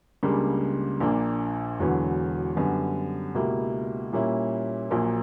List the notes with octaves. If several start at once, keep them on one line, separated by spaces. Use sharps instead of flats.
C#2 C#3 G3 A#3 D4
A#1 A#2 A#3 D4
E1 E2 D3 F#3 B3
F#2 D3 G3 B3
C#2 B2 A#3 E4 G4
A#2 G3 A#3 C#4 E4
A#1 A#2 F#3 A#3